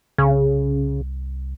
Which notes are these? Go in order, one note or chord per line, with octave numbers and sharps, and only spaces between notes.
C2 C#3